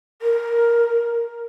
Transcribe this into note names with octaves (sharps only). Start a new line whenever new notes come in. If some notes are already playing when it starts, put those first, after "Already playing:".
A#4